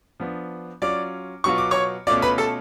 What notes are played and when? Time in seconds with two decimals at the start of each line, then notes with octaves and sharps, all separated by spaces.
0.20 F3 B3 D4
0.82 F#3 C#4 F4 D5 D6
1.44 B2 F#3 B3 F4 C#6
1.58 D6
1.71 C#5 C#6
2.07 B2 A3 C#4 F4 D5 D6
2.22 B4 B5
2.38 A4 A5